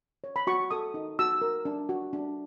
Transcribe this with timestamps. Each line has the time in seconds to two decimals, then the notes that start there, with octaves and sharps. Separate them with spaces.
0.24 C#5
0.36 B5
0.47 F#4 C#6
0.71 A4 D#6
0.94 D#4
1.19 F#4 E6
1.42 A#4
1.65 D4
1.89 F#4
2.13 D4